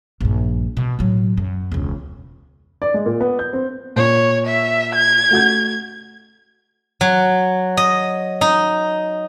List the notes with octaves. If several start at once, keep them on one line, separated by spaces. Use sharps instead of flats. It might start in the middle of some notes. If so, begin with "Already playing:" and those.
A#1 G2
B2
A2 F#3
F#2
E1 C#2
D5
G#3
A#2
B3
G6
C4
A#2 C#5
E5
G#6
A3 F#4 G6
F#3
D#5
D#4